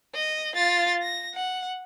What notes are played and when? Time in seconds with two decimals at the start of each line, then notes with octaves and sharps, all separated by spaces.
0.14 D#5
0.55 F4 A6
1.02 A#6
1.34 F#5